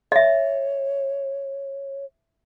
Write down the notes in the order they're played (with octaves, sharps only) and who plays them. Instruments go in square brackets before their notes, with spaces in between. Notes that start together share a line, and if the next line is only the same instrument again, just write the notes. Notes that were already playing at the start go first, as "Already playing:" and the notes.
[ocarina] C#5 [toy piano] D#5 E5